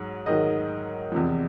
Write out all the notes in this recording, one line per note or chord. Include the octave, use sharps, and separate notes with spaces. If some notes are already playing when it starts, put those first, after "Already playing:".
Already playing: G#2 F#3
G#2 D#3 F#3 D#5
E2 C3 F3